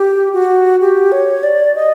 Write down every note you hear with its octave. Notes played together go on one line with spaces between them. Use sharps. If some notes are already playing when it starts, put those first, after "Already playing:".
Already playing: G4
F#4
G4
C#5
D5
D#5